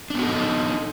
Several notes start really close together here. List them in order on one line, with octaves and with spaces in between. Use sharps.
D4 B3 F#4 A4 D#4